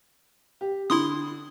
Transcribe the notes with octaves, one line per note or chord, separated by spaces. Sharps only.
G4
D3 E4 C6 D#6